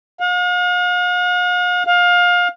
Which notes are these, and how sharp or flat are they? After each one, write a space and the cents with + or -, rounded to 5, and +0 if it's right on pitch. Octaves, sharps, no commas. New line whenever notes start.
F5 +45
F5 +25